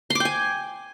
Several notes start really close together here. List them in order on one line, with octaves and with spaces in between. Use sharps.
C6 D6 G5 G#5